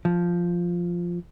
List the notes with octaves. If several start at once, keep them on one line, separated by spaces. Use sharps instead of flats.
F3